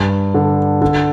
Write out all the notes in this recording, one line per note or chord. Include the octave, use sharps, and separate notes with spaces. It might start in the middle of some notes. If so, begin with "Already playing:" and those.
Already playing: G2
D3
D3